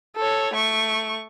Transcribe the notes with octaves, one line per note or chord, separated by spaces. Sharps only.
A4 C#5
A3 C#6